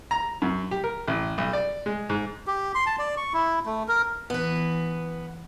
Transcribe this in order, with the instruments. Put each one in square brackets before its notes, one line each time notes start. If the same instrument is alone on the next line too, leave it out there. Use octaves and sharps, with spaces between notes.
[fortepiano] A#5
F#2
G4
A#4
A1
B1
D5
G#3
G#2
[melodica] G4
C6
A5
D5
C#6
E4
A3
A#4
[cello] E3 [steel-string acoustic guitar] B3 B4